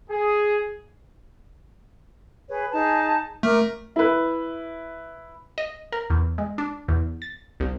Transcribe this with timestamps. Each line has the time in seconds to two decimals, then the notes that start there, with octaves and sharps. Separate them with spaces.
0.10 G#4
2.48 G#4 B4 C#5
2.72 D#4 G#4 A5
3.43 A3 A#4 D6 F6
3.96 E4 B4
5.58 D#5
5.92 A#4
6.10 E2
6.38 G#3
6.58 D4
6.88 E2
7.22 A6
7.60 C2